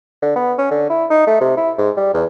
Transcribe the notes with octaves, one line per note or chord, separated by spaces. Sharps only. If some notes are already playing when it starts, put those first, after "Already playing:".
D3
B3
C#4
D3
E4
D#4
A3
C3
E4
G#2
G3
E2